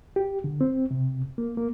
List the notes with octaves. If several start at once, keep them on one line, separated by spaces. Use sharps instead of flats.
G4
D3
C4
C3
A#3
A#3